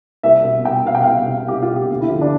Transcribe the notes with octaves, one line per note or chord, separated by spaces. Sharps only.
C2 E5
B2
C2 G5
B2 F5
G5
C2 F5
B2
C2 G4
F4
B2
G4
D2
E4
D3 F3 F4
D4